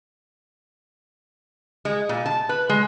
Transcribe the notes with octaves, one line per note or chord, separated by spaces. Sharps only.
G#3
A#2
A5
B4
G#3